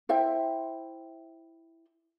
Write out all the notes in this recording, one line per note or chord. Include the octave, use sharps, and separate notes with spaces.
E4 C5 E5 G5